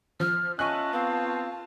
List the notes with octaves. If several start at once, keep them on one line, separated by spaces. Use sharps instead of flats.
F3 F6
C#4 F4 D#5 E5 G#5 A5 C#6 F#6
B3 C4 F5